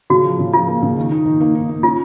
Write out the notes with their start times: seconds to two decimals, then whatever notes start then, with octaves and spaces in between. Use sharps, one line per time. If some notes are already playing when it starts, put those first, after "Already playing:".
0.10 C#3 F#4
0.24 F3
0.39 C#3
0.53 F3 F4
0.68 A#3
0.82 C#3
0.96 D#3
1.12 D#4
1.25 D#3
1.41 A#3
1.55 D#4
1.69 A#3
1.83 C#4 F4